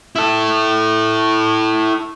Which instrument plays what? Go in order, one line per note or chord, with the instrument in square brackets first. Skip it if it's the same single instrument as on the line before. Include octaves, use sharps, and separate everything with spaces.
[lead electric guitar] E4 A4